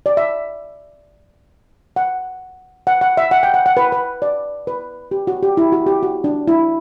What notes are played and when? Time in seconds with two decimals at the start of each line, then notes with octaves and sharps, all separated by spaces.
0.06 D5
0.17 E5
1.96 F#5
2.87 F#5
3.01 F#5
3.17 E5
3.31 F#5
3.43 G5
3.54 F#5
3.66 F#5
3.77 B4
3.92 B4
4.22 D5
4.67 B4
5.11 G4
5.27 F#4
5.43 G4
5.57 E4
5.72 F#4
5.87 G4
6.03 F#4
6.24 D4
6.48 E4